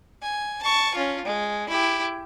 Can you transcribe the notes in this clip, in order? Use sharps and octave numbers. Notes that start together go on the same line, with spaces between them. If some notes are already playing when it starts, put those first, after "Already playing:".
G#5
A5 C#6
C#4 F4
G#3
E4 G4